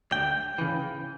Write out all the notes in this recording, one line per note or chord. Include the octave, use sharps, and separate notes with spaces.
D2 G5
C#3 E3